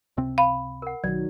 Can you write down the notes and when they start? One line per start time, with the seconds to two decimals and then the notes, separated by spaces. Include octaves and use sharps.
0.17 C#2 C3 C4
0.38 F5 B5
0.82 A#4 F#5
1.04 B1 D#3 F#3 D5